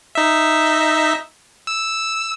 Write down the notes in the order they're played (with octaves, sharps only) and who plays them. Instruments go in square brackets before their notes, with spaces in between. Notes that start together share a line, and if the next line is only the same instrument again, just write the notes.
[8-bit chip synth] D#4 E5
E6